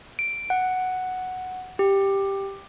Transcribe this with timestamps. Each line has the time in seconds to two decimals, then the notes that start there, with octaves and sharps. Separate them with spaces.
0.19 D7
0.50 F#5
1.79 G4